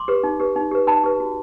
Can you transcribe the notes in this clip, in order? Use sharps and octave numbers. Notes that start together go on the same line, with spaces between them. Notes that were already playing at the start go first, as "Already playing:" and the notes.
Already playing: C6 D6
G4 B4
D#4
G4 B4
D#4
G4 B4
D#4 A5 B5
G4 B4
F#4